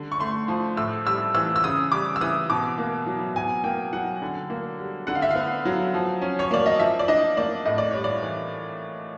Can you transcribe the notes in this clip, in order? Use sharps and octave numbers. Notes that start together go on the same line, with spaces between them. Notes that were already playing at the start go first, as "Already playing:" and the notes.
Already playing: D3 G3
C#6
A3 C6
F3
A2 E6
G3 E6
E3 E6
E6
C#3 D#6
G3 D6
E6
E3 D#6
B2 D6
A#3
F#3
B2 G#5
A#3 G5
F#3 F#5
D3
A#3
G3
D3 F#5
F5
E5
B3 F5
F#3
F3
C#4
C#5
A#3 D5
D#5
F3 E5
D5
D4 D#5
A#3 D5
A2 D#5
D5
G3 C#5
D5
E3